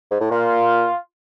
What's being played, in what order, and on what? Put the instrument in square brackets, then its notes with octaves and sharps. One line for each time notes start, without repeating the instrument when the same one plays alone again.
[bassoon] G#2
A2
[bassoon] A#2 [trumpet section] F4